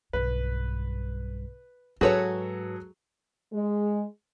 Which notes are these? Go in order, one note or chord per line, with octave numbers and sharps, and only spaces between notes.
B1 G2 B4
G#2 F#3 F#4 G#4 A4 B4 C#5
G#3